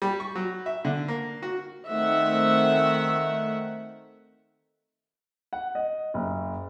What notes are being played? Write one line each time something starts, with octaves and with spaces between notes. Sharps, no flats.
G3
C#6
F#3
E5
D3
A#3
F#4
D#3 A3 C4 E5 F#5
F#5
D#5
F#1